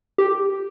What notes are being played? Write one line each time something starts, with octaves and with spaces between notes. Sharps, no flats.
G4